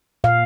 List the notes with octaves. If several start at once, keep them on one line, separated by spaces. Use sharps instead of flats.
A#2 F5